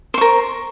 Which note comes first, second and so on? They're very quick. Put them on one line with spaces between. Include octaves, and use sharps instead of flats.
C5 C#6 A#4